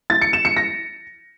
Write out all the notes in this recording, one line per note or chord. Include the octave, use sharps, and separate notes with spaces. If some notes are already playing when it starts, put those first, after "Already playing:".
A6
C#7
E7
C#7
A#6